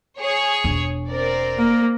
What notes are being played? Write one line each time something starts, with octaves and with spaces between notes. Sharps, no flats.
G#4 C#5 C#6
E1 D4
C4 A#4 D5
A#3